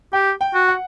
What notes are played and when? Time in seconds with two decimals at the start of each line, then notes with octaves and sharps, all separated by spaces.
0.13 G4 G5
0.41 G5
0.54 F#4
0.68 F#5